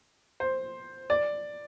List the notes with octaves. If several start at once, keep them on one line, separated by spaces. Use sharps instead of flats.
C5
D5